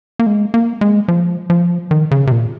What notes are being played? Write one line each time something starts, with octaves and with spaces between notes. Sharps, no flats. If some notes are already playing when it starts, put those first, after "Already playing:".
A#3
G#3
A#3
G#3
F3
F3
D#3
C#3
C3
A#2